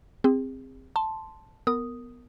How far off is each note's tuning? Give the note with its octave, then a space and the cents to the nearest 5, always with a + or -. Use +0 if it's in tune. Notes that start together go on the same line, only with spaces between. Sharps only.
C4 +0 G#4 -35
A5 +0 C6 +0
B3 +0 A#4 -15 D#6 +0